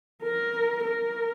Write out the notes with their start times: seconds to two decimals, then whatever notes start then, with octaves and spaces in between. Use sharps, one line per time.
0.23 A#4
0.84 A#4